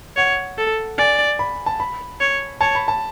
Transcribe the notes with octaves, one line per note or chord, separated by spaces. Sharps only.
C#5 F#5
A4
D5 G#5
B5
A5
B5
C#5
C#5 A5
B5
A5